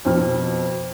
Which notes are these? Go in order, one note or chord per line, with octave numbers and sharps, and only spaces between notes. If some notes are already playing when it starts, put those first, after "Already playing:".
F2 B2 F6